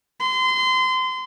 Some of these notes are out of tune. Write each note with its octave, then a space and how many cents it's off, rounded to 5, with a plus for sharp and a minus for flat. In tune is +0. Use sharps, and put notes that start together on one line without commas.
C6 -30